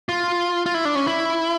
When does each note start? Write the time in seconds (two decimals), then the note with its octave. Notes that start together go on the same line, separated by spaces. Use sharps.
0.09 F4
0.66 F4
0.74 E4
0.85 D4
0.95 C#4
1.07 E4